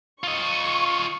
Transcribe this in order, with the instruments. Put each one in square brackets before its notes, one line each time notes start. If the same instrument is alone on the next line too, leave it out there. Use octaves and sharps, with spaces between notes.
[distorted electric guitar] F4 D#5 [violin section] C#6